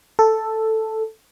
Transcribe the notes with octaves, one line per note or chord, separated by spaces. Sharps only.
A4